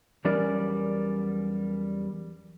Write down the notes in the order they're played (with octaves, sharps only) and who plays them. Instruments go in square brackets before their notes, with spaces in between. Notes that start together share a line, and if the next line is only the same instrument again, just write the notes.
[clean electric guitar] E2 F#3 G3 C#4 A#4 D5